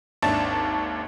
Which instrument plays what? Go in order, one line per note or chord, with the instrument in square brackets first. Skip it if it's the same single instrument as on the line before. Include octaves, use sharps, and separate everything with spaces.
[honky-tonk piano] G#1 D#2 D4 E5 A5 A6